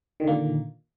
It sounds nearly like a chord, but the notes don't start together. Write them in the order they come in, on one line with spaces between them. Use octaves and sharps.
D#3 D3 A#3 A#2